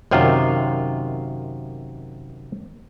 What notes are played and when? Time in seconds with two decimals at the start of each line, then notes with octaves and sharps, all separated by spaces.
0.11 F#2 C3 D#3 F4